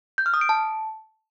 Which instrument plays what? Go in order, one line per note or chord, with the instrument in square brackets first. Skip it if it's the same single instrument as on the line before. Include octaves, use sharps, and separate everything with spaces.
[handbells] G6
F6
D#6
D7
A5